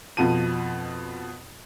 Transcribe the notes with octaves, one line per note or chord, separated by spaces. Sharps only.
F2 B2 F3 A5 D#7